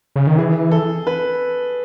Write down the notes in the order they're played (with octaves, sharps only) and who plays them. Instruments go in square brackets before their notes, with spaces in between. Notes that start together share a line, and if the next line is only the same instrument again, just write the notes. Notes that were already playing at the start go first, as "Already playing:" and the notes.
[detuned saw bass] C#3
D#3
[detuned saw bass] E3 [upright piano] G#4
[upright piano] A4
B4